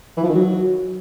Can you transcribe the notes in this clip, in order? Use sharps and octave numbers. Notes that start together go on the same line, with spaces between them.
E3
F3
D#3
F#3